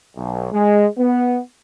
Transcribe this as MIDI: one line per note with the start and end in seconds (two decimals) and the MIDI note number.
0.17 0.52 35
0.52 0.87 56
0.98 1.40 59